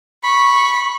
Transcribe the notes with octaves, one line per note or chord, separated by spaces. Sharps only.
B5 C#6